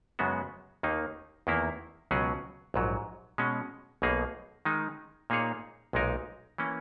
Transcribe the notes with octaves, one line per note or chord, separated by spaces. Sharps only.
F#2 C#3 G#3 B3 F#4
D#2 D#3 A#3 D#4
E2 D#3 A#3 E4
C#2 B2 F#3 C#4 G#4
A#1 G#2 F#3
B2 G#3 C#4
B1 B2 A#3 D#4 G#4
D#3 G#3 D#4
A#2 A#3 D#4 G#4 C#5
B1 A#2 G#3 D#4 A#4
E3 A#3 C#4